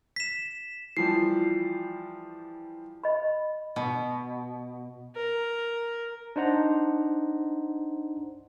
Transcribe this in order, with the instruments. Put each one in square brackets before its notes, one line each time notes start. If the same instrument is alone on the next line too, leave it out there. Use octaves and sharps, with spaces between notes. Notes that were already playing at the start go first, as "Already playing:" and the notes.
[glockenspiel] B6 E7
[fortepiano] E3 F3 G3 [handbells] C7
[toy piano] D#5 B5
[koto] B2
[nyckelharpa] A#4
[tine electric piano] D4 D#4 C5 F#5 A#5